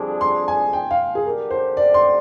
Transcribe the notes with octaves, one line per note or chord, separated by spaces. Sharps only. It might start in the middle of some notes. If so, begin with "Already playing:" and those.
Already playing: F2 D3 G3 D4 G#4
C6
G#5
G5
F5
G#4
D3 G3 D4 G4 A#4
C5
D5
C6